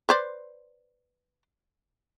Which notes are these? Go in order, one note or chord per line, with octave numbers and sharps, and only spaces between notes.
B4 C5 D5